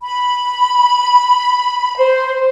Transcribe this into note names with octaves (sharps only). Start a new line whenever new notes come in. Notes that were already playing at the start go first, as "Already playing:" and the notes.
B5
C5